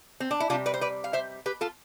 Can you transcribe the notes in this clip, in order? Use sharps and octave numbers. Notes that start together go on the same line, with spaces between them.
C4
D4
E4
C3 G3 D4 F4
B4 D5
C5
B4 D5
F5
C5 E5
G4 B4
F4 A4